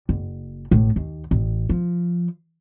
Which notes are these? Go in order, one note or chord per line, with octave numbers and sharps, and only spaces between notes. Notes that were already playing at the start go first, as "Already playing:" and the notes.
F#1
A1 A2
D#2
A1
F3